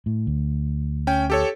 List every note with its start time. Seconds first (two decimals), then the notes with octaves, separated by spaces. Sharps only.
0.06 A2
0.27 D2
1.07 C#4 G5
1.30 G4 A4 C#5